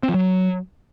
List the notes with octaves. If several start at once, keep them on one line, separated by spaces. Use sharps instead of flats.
C4
F3
F#3